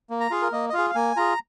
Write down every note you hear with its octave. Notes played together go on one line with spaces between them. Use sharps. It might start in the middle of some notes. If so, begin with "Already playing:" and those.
A#3
A#5
F4 G#4 F5
A#4
A#3 D#5
D#5
F4 G#4 F5
F5
A#3 G#5
F4 G#4 A#5